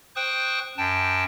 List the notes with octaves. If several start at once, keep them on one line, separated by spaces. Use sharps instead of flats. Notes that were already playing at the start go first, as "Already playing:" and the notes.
C5 G5 C#6 D#6 F#6
F#2 G5 A5